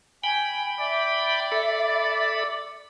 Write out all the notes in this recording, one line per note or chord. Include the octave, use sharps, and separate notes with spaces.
G5 G#5 B5
D5 E5
A4 B5